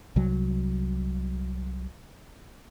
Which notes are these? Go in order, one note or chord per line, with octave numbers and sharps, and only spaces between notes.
C2 F#3